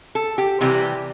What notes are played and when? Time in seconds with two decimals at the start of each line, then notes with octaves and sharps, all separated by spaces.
0.15 A4
0.38 G4
0.61 C3 E3 G3 G4